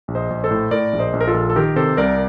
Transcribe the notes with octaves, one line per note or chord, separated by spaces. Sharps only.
A#1
C5 D#5
A#1
A4 C5
A2
A2 A#4 D5
A#1
C5 D#5
A#1
A#4
F4 A4
A#1
A4
D#3 G4 A#4
C3 A4 C5
C2 A#4 D5